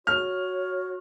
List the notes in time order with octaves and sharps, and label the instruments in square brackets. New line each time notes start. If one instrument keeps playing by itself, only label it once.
[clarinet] F#4 [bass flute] C#5 [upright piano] F6